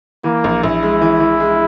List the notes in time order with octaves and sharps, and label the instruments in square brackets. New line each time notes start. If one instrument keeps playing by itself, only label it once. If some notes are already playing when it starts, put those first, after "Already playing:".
[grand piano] E3 [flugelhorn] A#3
[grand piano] A#1
[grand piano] A#1 [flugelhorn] E4
[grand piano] G#3
E3
E3
G#3